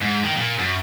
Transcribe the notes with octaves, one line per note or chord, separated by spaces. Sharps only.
G#2
D#3
A#2
F#2